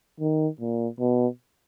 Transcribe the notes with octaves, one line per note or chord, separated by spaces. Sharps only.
D#3
A#2
B2